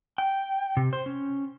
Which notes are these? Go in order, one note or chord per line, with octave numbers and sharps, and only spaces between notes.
G5
C3
C5
C#4